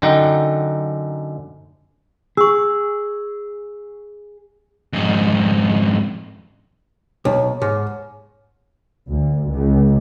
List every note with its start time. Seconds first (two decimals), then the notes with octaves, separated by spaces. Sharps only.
0.02 F#2 D3 D#4 F#5 G5
2.37 G#4 C#6 E6
4.93 F2 G#2
7.25 B1 C#5
7.62 G#2
9.10 D2
9.50 C#2